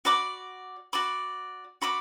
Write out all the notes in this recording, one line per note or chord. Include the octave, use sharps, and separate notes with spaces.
F#4 D5 B5 D6
F#4 D5 B5 D6
F#4 D5 B5 D6